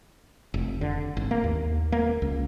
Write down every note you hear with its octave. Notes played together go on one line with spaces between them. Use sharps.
F1
D3
G#1
A#3
D#2
A#3
C#2